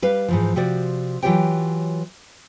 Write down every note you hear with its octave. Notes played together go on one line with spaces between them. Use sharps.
G3 B4 F5
G#2 E3 F3
C3 F3 F#4 D5
E3 F#3 F4 G4 C#5 G5